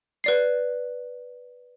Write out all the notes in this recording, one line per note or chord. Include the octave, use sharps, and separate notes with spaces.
B4 D5 C7